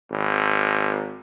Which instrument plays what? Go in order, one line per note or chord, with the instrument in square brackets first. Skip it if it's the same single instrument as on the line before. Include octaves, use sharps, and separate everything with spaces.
[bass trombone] G#1